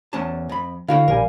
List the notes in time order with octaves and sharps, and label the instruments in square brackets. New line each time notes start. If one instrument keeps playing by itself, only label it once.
[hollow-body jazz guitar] E2 C#4 A5
F2 B5
[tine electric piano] D3 [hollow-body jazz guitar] E4 F#4 G5 [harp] F5
[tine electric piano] A#1 G3 G#5 [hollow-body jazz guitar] A#4